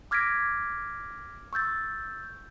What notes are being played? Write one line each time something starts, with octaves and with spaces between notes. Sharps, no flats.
D6 F6 G#6 A#6 B6 D7
C#6 E6 G6 A6